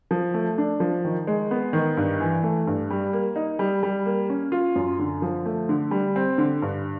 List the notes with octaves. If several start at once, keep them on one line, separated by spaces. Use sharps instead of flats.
F3
A3
D4
F3
D#3
G#3
B3
D#3
G2
E3
A3
G2
G3
A#3
D#4
G3
G3
A#3
C#4
F4
F#2
D3
F3
A3
D3
G3
C4
D3
G2